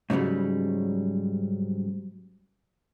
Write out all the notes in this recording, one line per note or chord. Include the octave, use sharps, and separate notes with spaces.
G#2 C#3 E3 F#3 G3